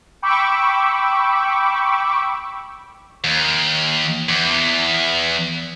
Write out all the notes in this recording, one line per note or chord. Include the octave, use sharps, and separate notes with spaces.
G5 B5 C#6 D6 E6
D#2
E2